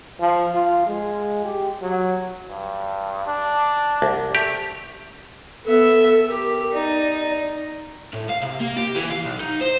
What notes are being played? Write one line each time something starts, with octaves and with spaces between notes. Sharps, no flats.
F3
F4
G#3
G4
F#3
G2
D4
C2
A3 G4
B3 A4 E5
G4 A#4
D#4 D5
A2
F5
C3
A#3
G4
E3
F5
B1
D#4
C5